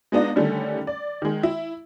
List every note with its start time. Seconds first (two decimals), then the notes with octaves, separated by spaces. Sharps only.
0.12 G#3 B3 D4 D#4 F4
0.36 D3 D#3 G3 A3 C#4
0.87 D5
1.22 D#3 G#3
1.43 E4